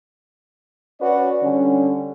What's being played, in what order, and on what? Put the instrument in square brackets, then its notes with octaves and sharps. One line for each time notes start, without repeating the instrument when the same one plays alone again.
[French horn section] C#4 F#4 B4 C#5 D5
D3 G3 C#4